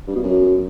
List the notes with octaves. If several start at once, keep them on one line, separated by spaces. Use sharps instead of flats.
G2
B2
F#2